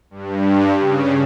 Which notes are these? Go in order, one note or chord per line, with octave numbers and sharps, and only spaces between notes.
G2
C#3